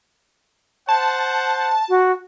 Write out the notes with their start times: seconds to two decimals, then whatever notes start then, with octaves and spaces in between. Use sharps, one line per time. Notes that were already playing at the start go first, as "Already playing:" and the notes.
0.89 C5 F#5 A5
1.89 F#4